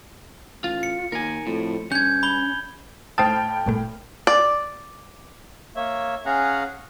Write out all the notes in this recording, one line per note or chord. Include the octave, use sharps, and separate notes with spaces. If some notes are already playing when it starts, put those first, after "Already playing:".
A1 F4
C#7
D#2 A#4 G#5
F2 A2
G2 C#4 G6 G#6
B5 G7
A2 C5 G5 A5 D#6 F6
G1 A#2 A3
D5
A#3 C#5 E5
C#4 G#4 F5 F#5 A#5